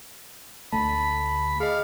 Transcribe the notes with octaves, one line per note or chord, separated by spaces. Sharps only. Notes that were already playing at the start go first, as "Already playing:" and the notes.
D2 D3 A3 A5 B5
G#4 D#5 F5